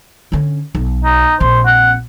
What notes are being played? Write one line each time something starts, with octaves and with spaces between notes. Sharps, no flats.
D3 C#4
B1
D#4
A#1 C4 C5
F#5